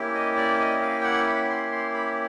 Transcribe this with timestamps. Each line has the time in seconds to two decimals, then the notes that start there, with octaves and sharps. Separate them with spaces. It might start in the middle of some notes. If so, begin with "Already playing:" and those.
Already playing: A#3 C#4 E4 G4
0.14 D#5
0.37 D5
0.60 D#5
0.82 F5
1.00 G5
1.04 F#5
1.27 B5
1.50 C6
1.72 C6
1.94 B5